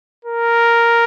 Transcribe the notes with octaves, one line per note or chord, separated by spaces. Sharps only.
A#4